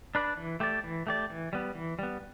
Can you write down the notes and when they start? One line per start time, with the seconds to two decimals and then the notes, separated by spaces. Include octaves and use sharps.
0.15 D4 B4 D5
0.37 E3
0.60 A3 G4 D5
0.84 E3
1.07 A3 G4 D5
1.30 E3
1.53 G3 B3
1.75 E3
1.99 G3 B3